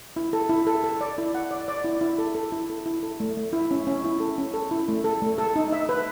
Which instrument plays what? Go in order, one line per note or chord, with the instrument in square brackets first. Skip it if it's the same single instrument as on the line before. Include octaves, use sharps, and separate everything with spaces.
[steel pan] E4
A4
E4
A4
A4
D5
E4
F#5
D5
D5
E4
E4
A4
A4
E4
A4
E4
A4
A3
A3
E4
C#4
C#4
E4
A4
C#4
A4
E4
A3
A4
A3
A4
D#4
E5
B4